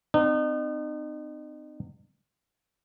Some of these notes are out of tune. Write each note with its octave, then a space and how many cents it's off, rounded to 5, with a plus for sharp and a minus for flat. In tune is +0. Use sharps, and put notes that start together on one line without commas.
C4 -35 D#4 -40